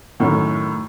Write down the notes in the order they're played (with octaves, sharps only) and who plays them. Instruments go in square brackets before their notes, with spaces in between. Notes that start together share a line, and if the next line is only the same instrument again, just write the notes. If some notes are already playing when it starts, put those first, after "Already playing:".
[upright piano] F#2 A2 D#3